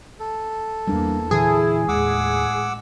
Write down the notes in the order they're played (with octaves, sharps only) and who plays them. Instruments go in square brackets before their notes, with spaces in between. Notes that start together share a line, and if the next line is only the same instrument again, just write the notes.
[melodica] A4
[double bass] E2 A#3 [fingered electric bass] G3 D4
[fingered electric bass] A#2 D3 E3 [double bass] E4 [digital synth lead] G#4
[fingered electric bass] D#2 [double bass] A2 G#3 [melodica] F#5 D6 E6